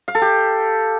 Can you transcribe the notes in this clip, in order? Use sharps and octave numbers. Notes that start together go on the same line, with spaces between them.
F5
A4
G4